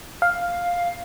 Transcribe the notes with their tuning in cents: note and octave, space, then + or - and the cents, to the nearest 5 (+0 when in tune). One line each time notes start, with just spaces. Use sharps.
F5 +5